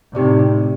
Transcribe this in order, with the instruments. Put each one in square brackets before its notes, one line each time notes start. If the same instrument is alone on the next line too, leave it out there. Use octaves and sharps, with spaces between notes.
[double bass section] A2 C3 [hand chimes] D#4 G4 D5